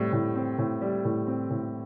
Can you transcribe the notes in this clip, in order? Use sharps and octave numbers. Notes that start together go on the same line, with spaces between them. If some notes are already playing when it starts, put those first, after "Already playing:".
Already playing: A2 G3 C4
A2
C4
A2
G3
A2
C4
A2